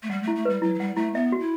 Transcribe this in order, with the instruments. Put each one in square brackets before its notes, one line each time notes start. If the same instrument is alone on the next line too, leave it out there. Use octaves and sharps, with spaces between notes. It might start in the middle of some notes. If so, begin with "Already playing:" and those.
[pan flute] A3
[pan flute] G3 [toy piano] F#5
[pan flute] A3
[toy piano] E4
[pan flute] A3
[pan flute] G3 [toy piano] B4
[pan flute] F#3 [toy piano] E4
[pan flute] F#3
[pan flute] G3 [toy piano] F#5
[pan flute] A3 [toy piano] E4
[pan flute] B3 [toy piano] E5
[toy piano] F#4
[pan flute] E4